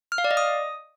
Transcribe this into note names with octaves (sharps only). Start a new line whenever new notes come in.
F6
F5
D5
D#5
D#6